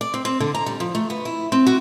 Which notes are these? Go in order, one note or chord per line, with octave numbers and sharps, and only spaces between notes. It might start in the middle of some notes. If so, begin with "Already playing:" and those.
D5
C4
C4
D3
A#5
G3
F3
A3
B3
E4
C4
F#4